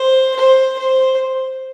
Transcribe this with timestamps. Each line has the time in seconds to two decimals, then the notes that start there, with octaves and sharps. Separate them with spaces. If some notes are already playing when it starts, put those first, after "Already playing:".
Already playing: C5
0.36 C5
0.78 C5